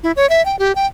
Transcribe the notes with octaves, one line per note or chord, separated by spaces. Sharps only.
E4
C#5
E5
G5
G4
G5